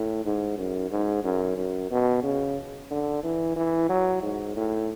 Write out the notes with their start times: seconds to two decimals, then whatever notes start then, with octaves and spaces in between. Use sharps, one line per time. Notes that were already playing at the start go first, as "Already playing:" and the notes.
Already playing: A2
0.25 G#2
0.58 F#2
0.91 G#2
1.24 F#2
1.57 F#2
1.91 B2
2.23 C#3
2.90 D3
3.23 E3
3.56 E3
3.89 F#3
4.22 G#2
4.56 A2